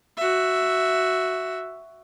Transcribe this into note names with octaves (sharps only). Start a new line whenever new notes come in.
F#4 E5